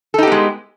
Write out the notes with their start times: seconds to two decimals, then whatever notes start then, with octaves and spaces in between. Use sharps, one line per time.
0.14 A4
0.18 D#4
0.23 G4
0.27 B3
0.32 G#3